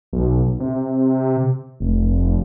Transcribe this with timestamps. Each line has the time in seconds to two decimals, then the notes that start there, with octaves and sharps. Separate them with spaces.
0.13 B1
0.60 C3
1.80 F1